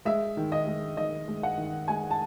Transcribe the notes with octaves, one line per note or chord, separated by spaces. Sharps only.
G#3 E5
D#3
D#5
G#3
D#3 D#5
G#3
F#5
D#3
G#3 G#5
A5